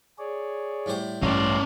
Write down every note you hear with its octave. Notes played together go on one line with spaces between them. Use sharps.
G#4 C#5 D5
A2 G3 C5
A1 G2 C#4 D5 A#5 C6